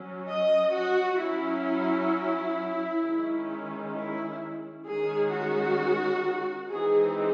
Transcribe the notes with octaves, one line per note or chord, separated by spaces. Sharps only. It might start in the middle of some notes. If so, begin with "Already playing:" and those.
Already playing: F#3 C#4
D#5
F#4
F#3 C#4 E4
D#3 G#3 C#4
E4
D#3 G#3 C#4 G#4
F#4
E3 G#3 C4 D#4 G#4